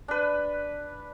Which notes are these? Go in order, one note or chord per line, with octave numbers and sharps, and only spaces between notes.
D4 B4